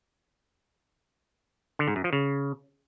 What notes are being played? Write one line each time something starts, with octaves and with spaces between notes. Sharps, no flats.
D3
G#2
F#2
F3
C#3